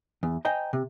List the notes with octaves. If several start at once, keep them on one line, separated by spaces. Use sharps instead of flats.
E2
C5 D#5 G5 G#5 A#5
C3